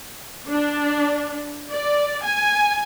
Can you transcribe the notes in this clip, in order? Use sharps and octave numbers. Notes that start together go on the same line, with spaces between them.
D4
D5
G#5